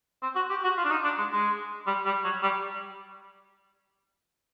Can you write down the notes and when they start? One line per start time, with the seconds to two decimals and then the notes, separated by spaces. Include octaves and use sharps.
0.22 C4
0.35 F#4
0.49 G4
0.64 F#4
0.77 F4
0.84 D4
0.90 D#4
1.04 D4
1.18 G#3
1.33 G#3
1.87 G3
2.05 G3
2.24 F#3
2.43 G3